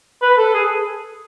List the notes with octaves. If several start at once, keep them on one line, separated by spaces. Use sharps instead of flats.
B4
A4
G#4